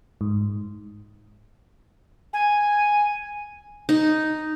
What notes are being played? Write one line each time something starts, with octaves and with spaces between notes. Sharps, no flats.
G#2
G#5
D#4